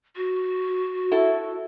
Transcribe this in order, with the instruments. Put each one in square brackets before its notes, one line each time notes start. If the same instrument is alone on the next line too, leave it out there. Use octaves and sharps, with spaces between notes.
[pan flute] F#4
[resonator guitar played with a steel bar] E4 A4 F#5